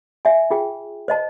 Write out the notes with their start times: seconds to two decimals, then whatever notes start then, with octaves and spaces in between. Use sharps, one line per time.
0.25 E5 G#5
0.51 F4 G#4 G5
1.08 C5 D#5 A5